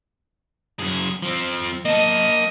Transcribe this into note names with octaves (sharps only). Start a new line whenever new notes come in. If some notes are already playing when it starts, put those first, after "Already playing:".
F#2 G#4
F3 C4
A#3 D#5 A5